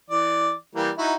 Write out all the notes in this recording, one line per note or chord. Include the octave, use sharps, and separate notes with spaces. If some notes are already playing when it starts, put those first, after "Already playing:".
E3 D5
E3 G3 A#3
D#4 E4 F#4